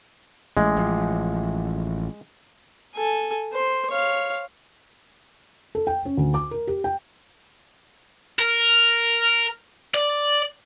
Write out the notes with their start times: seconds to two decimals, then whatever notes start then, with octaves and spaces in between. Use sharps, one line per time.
0.57 A1 G#3
0.76 A1 F3
2.95 A4 G#5
3.53 C5
3.90 C#5 F5
5.75 A4
5.87 G5
6.05 C#4
6.17 D2
6.34 D6
6.51 A#4
6.67 G4
6.84 G5
8.39 A#4
9.94 D5